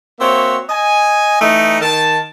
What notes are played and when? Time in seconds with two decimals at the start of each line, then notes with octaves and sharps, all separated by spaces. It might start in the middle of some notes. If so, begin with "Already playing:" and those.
0.20 A#3 C4 F#4 C#5 E5
0.69 D#5 G#5
1.41 E3 A3 D#4
1.81 D#3 A5